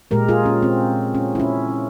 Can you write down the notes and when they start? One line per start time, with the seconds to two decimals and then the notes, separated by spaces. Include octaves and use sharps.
0.11 A#2 G#3 G4 A#4
0.28 F4 G#4
0.45 C#4
0.63 C4
1.15 C#4
1.35 E4
1.40 C#4